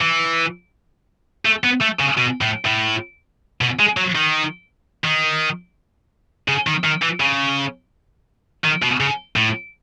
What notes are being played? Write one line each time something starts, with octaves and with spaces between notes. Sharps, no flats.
E3
A3
B3
A3
C#3
B2
A2
A2
B2
G#3
F#3
D#3
D#3
C#3
D#3
D#3
E3
C#3
D#3
B2
C#3
A2